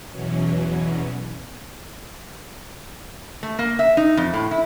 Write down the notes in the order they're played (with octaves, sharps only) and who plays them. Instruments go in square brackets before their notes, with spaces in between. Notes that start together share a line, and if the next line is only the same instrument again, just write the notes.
[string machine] E2 B2 E3 F#3 C#4
[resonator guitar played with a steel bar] A3
A#3
E5
D#4
F2
A2
E4